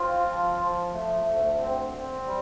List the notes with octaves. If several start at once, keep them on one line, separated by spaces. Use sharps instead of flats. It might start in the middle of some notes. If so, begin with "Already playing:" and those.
Already playing: C4 F4
F3
F3
A3
D2
C4
C4
G3